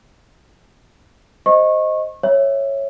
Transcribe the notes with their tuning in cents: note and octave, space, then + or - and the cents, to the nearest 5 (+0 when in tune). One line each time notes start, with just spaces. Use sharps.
C5 +0 D#5 +0 C#6 -25
C#5 -10 E5 +0